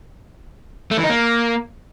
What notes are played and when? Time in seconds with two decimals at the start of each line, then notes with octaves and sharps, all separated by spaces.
0.91 A3
0.97 E3
1.03 D#4
1.10 A#3